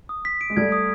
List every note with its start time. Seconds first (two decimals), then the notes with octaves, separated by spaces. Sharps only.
0.09 D#6
0.25 B6
0.41 D7
0.50 G#3
0.57 G3 A3 G#6
0.72 D#6